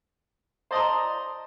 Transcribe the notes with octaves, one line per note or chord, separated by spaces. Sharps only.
C5 D5 D#5 A5 A#5 C6